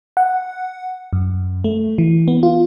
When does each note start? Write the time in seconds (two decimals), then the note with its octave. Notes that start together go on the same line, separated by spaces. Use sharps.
0.17 F#5
1.13 F#2
1.64 A3
1.98 E3
2.28 B3
2.43 F4